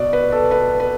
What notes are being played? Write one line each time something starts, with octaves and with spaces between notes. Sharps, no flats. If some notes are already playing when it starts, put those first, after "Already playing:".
Already playing: B2 D5
B4
A4
B4
B4